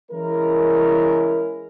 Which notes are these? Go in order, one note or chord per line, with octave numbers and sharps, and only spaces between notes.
E3 G#3 C#4 E4 A#4